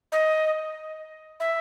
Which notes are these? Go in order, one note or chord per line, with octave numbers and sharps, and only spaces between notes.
D#5
E5